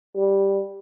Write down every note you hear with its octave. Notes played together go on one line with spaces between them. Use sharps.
G3